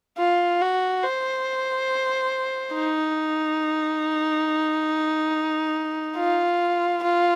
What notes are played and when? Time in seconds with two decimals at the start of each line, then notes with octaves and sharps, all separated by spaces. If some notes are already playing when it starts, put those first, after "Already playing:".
0.17 F4
0.61 F#4
1.03 C5
2.74 D#4
6.16 F4
7.03 F4